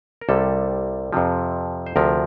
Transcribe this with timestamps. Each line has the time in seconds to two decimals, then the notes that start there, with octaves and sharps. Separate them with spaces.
0.21 A#4
0.29 C2 C3 G3 A4
1.13 F2 C3 F3
1.87 C5
1.96 D2 C3 F3 A#4